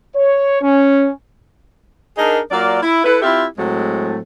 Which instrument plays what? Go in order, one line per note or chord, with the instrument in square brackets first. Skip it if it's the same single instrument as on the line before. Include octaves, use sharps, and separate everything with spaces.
[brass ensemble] C#5
C#4
[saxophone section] D4 D#4 G#4 A#4
F#3 A#3 F4 D5
E4
E4 A4 B4
C4 E4 F4 G4 E5
A2 F#3 G#3 A3 C4